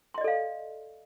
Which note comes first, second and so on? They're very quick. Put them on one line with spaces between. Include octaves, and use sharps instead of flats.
C6 D#5 D5 A4 F5